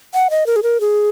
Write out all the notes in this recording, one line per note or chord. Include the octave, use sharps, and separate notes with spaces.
F#5
D#5
A#4
G#4
A#4
G#4